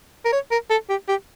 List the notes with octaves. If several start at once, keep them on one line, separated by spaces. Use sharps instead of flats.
A#4
C#5
A#4
A4
G4
G4